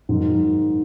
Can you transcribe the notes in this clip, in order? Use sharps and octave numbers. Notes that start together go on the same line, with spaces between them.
G#2 D#3 F#3